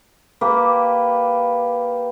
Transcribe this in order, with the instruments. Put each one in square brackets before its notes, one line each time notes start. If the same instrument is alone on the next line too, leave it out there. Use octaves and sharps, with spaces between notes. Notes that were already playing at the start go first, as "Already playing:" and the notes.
[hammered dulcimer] A#3 G4 B4